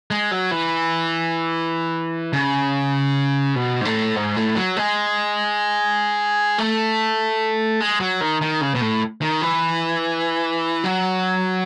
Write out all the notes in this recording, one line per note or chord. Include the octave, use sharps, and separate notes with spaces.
G#3
F#3
E3
C#3
B2
G#2
A2
G#2
A2
F#3
G#3
A3
G#3
F#3
D#3
D#3
C#3
B2
A2
D#3
E3
F#3